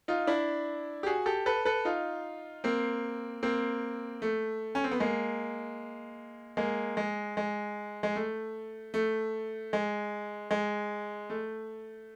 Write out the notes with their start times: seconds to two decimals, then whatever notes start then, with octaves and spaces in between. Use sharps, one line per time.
0.08 D#4 F4
0.27 D4 E4
1.03 G4
1.07 F#4 G#4
1.26 G4 A4
1.46 A4 B4
1.65 A4 B4
1.85 D#4 F4
2.64 A#3 C4
3.43 A#3 C4
4.22 A3
4.75 C#4
4.84 C4
4.91 B3
5.00 G#3 A#3
6.57 G#3 A#3
6.97 G#3
7.37 G#3
8.03 G#3
8.16 A3
8.94 A3
9.73 G#3
10.51 G#3
11.30 A3